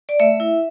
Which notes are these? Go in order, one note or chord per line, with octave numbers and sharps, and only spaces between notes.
D5
A3 E5
E4